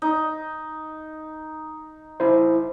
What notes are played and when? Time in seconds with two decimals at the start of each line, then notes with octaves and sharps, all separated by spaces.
0.02 D#4
2.20 E4 C5